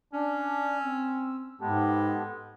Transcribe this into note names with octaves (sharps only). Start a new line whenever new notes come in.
C#4 D4
C4 E6
G#2 G#3 B3 G4 A4